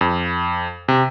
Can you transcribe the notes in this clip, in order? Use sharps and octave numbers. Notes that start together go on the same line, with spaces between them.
F2
C3